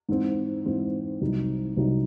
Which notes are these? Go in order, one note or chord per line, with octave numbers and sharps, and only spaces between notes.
G#2 E3 C4
G#2 E3 C4
C2 C3 F#3 C4 D#4
C2 C3 F#3 C4 D#4